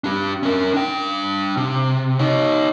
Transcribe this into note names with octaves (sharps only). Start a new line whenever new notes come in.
D4 G4
C#4 A#4
D4 G5
C3
D#4 C#5